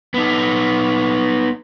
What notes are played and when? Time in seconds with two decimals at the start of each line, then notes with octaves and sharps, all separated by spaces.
0.14 B3 D#4